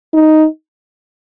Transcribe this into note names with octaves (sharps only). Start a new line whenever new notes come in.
D#4